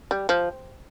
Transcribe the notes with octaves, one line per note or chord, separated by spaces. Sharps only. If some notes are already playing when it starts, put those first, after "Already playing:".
G3
F3